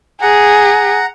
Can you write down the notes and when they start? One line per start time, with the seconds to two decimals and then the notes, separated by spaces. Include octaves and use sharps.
0.22 G#4 F#5 A#5